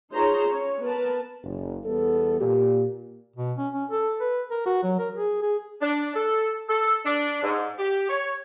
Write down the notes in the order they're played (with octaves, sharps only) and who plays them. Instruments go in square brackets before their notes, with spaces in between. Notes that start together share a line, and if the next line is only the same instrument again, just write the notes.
[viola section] D#4 F4 G#4 C5 C#5 A#5
C#4 C#5
B3 A#4 B4 A5
[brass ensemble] F#1
E2 G3 B3 A4
A#2 G4
[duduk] B2
C#4
C#4
A4
B4
A#4
F#4
F#3
A#4
G#4
G#4
[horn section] D4
A4
A4
D4
G#2
G4
C#5